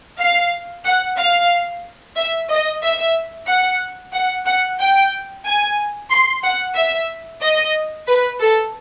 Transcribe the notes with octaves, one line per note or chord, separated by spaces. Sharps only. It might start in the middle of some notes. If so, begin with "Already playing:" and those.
F5
F#5
F5
E5
D#5
E5
F#5
F#5
F#5
G5
G#5
C6
F#5
E5
D#5
B4
A4